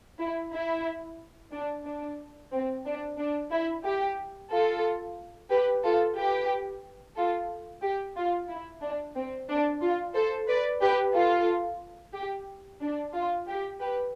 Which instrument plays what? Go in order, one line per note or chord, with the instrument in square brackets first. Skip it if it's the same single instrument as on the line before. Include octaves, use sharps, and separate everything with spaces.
[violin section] E4
E4
D4
D4
C4
D4
D4
E4
G4
F4 A4
G4 B4
F4 A4
G4 B4
F4 A4
G4
F4
E4
D4
C4
D4
F4
A4 C5
B4 D5
G4 B4
F4 A4
G4
D4
F4
G4
G4 B4